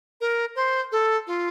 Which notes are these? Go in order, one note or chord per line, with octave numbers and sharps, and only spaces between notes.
A#4
C5
A4
F4